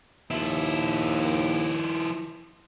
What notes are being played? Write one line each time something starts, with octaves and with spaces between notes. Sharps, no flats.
D#2 F3 E4